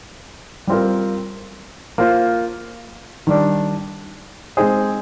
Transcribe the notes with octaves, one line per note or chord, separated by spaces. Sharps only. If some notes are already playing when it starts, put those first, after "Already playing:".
G3 C4 F4 A#4
A#3 F4 C5
D#3 G3 D4
G#3 C4 D#4 G#4 C5